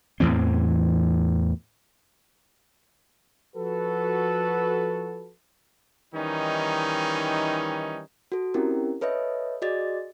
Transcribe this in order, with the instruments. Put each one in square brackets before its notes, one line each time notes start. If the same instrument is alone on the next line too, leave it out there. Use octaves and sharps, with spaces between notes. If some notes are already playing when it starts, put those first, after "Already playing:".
[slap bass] E2 A2 E3 C4
[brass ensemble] F3 F#4 A4 B4
[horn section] D#3 E3 G3 C#4 D#4
[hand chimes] F#4 A4
C4 C#4 E4 G4 A#4
A4 B4 C#5 D#5 E5
F#4 G#4 D5 D#5 A6